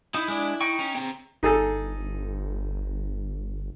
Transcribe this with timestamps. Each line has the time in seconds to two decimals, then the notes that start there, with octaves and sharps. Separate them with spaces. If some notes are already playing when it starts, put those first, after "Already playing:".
0.14 D#4 E4
0.28 G#3 D4
0.61 D#4 G5 C#6
0.79 C#4
0.95 C4 A#5
1.43 G1 D#4 G#4 A4